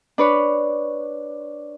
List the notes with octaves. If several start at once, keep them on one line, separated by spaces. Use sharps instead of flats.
D4 B4 C#5